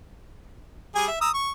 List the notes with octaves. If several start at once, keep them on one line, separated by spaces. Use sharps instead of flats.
G3 G#4 G#5
E5
A#5 D#6 E6
C#6